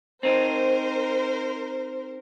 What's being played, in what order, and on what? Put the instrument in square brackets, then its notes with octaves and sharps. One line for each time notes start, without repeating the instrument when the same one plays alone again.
[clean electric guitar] C4 D#4 [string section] A#4 C5